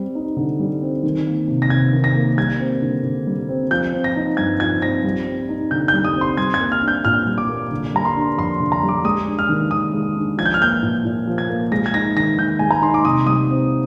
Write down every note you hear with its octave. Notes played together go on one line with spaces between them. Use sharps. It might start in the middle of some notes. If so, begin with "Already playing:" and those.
Already playing: G3 C4
D#4
D3
G3
C4
D#3
A#3
C3
A#6
C3 G#6
D#3
A#6
A#3
G3 G#6
C4
D3
D3
G3
C4
F3 G6
C4
A#6
D#4
G2 G#6
F3 G#6
C4 A#6
G3
C4
D#4
D3 G6
G6
G3
D#6
C4
C6
G3 G#6
G#6
A#3
F6
D4
G6
A#2 F6
G3
D6
A#3
D3
G3 A#5
C6
D4
F2 C6
D3
A#5
G3
D6
G#3 D#6
D4
F6
D#3
D#3 D#6
G#3
D4
F3 G#6
G6
F6
A#3 G6
A#2
A#2
F3
G#6
A#3
G#3 A#6
G#6
D#4 A#6
D#3 A#6
D#3 G6
G#3 G#5
A#5
D#4 C6
D6
C3 D#6
G3 D#6
C4